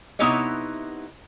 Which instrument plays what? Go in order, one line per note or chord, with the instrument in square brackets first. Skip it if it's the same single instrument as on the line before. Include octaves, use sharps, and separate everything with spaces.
[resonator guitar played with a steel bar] C3 B3 D#4 E4 C#5 D#5